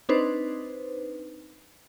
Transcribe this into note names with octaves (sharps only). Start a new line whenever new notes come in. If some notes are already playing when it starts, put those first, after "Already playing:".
C4 D4 D#4 B4 C5